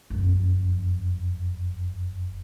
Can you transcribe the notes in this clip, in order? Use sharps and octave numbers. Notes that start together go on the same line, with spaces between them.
F#1 F2